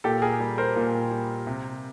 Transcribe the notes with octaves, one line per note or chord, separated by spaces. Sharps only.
A#2 G4 A4
G#4 A#4
G3
A#4 C5
A#2
G3
C3